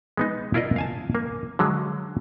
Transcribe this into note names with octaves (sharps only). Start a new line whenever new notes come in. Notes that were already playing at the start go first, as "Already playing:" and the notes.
G#3 B3 D#4
E4 F4 A#4 D5 D#5
F5 G#5 A5
A#3
D3 F#3 G#3